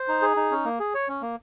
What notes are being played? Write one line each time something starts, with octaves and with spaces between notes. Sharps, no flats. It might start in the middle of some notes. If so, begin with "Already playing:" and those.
Already playing: C5
D#4
G#4
D#4
C#4
A#3
G#4
C#5
C#4
A#3